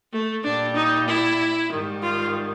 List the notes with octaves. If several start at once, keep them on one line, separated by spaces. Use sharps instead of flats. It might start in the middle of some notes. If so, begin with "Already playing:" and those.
A3
A#2 G3 D4
D#4
E4
G#2 D#3 G3
F4